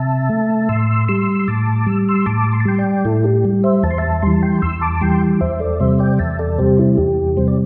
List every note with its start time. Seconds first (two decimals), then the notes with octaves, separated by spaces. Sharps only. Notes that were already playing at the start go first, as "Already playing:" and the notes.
Already playing: C3 E5 A5
0.29 A3
0.69 A2 C6 E6
1.08 G3 C6 E6
1.39 C6
1.48 A2 A5 D6
1.86 G3 E6
2.09 C6 E6
2.26 A2 A5 D6
2.52 C6
2.60 A5
2.65 G3 G5 C6
2.78 D5 G5
3.05 A2 E4 A4
3.24 G4
3.45 G3
3.64 C5 E5
3.83 E2 A5
3.91 C6
3.98 E5 A5
4.22 E3 G3 C6
4.33 A5
4.42 G5 C6
4.62 E2 C6 E6
4.81 A5 D6
5.01 E3 G3 G5 C6
5.41 E2 C5 E5
5.60 A4 D5
5.80 C3 G3 C5 E5
5.99 D5 G5
6.19 E2 E5 A5
6.39 A4 D5
6.58 C3 G3 G4 C5
6.78 E4
6.98 E2 G4
7.37 C3 G3 C5
7.48 D5